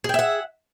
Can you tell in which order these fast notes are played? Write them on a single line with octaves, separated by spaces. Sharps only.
G#4 G5 E5 F#5